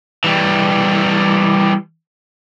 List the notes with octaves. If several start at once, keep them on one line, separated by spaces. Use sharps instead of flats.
E3 G3